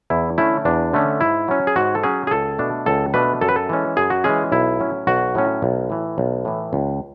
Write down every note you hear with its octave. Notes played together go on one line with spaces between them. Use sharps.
E2 E4
D3 A3 C#4 E4
E2 D4
D3 A3 C#4
G#2 E4
F#3 C#4
G#4
G#2 F#4
A4
F#3 C#4 G#4
G#4
C#2 A4
B2 A3 D4
C#2 A4
B2 A3 D4 B4
F#2 A4
B4
A4
E3 G#3 C#4
F#2 G#4
F#4
E3 G#3 C#4 G#4
B1 E4
A2 F#3 C#4
B1 F#4
A2 F#3 C#4
B1
A2 E3
B1
A2 E3
C#2